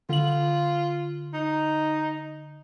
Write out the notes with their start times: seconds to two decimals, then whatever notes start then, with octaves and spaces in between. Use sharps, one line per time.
0.09 D3 F4 F#7
1.34 D#4